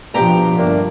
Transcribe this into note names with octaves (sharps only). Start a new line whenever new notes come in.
G2 B2 F3 G4 G5 A#5
G1 A3 A#3 D4